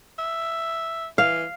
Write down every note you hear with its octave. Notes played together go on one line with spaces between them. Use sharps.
E5
E3 F5